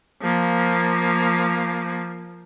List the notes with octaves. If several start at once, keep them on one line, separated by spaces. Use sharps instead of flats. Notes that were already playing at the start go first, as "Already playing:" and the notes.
F3 A#3